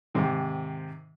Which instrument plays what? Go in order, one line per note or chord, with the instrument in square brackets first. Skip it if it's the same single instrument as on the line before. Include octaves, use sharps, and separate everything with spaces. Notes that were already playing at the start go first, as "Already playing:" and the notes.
[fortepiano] G#2 C3 D#3